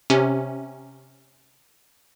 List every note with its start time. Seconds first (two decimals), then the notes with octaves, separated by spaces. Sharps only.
0.10 C3 C#4